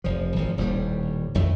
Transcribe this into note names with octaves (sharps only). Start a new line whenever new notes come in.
F1 F3
G#1 F3
D#1 D#2 A2 G3
G#1 F2 A2 A3